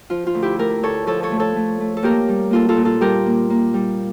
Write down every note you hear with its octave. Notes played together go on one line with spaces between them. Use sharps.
F3 F4
F4
D2
E4 G4
A3 G4 A#4
D2 A4 C#5
F3 A4 C#5
A4 C#5
A3
A4 C#5
A3
A3
A4
A#3 G4 A#4
G3
A#3 F4 A4
F4 A4
A#2
F4 A4
G3 G4 A#4
A#3
A#3
G3